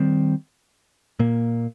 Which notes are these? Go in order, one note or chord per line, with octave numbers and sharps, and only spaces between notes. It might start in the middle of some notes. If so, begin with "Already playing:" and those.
Already playing: D#3 G3 C4
A#2 A#3